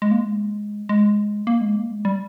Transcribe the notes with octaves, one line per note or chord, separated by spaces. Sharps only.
G#3
A#3
G#3
G#3
A#3
G#3
A#3
G#3
G3